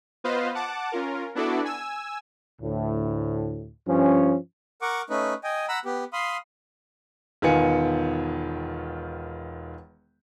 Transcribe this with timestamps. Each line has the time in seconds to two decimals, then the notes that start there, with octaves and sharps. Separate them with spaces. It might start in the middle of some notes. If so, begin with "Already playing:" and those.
0.24 B3 F4 B4 C5 D#5 F5
0.55 F#5 A5 D6
0.92 C#4 F4 A#4
1.35 B3 D4 E4 F#4 A4 D5
1.65 G#5 E6
2.62 D2 A2
3.86 G2 F3 C#4
4.82 A#4 F#5 C#6 D6
5.10 A3 C#4 D#4 B4
5.44 D#5 G5 G#5
5.69 F#5 A#5 B5 E6
5.85 B3 G4
6.13 F5 B5 C6 D#6
7.42 E1 D#3 B3 F4 G#5 C#7